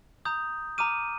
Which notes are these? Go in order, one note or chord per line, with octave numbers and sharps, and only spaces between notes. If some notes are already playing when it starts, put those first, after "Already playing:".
A#5 D#6 G6
A#5 D6 F6 D#7